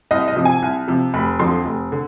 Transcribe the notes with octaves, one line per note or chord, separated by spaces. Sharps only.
C2 D#5
D#5
C3 F3
G#5
C2
C3 F3
F1 B5
F2 D3 F3 C6
F1
D3